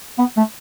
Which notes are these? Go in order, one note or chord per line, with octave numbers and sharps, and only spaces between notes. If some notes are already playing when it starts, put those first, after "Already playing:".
B3
A3